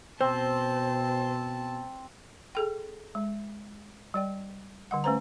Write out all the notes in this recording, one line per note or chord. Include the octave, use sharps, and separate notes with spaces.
B2 C4 C5 A5
G#4 A4 G5
G#3
G3 D5 G5
D3 G3 F#5
A3 C#4 B4 C5 A#5